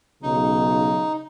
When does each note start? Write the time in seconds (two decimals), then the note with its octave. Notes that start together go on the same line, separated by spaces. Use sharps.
0.22 B1 C#3 D#4